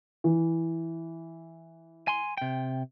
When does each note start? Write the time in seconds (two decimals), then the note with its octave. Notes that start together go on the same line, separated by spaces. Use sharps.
0.24 E3
2.08 G#5 C6
2.37 C3 G5